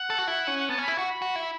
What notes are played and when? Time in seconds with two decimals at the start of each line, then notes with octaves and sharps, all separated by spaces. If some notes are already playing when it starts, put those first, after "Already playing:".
Already playing: F#5
0.10 A4
0.18 F#4
0.27 E4
0.47 C#4
0.59 F#5
0.68 B3 A5
0.78 C#4 B5
0.88 E4
0.96 F#4 C#6
1.09 B5
1.22 F#4
1.36 E4